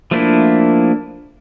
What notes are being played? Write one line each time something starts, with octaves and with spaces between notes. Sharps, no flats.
F3 A3 A#3 D4 E4